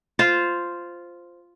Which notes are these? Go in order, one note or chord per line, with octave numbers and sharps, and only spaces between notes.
F4 C5